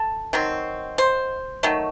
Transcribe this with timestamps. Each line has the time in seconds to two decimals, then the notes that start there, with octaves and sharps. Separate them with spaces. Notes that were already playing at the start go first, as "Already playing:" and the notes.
Already playing: A4
0.33 D#3 F#3 C4
0.98 C5
1.63 D#3 F#3 A3